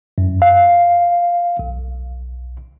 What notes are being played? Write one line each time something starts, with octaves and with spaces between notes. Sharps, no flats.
F#2
F5
B1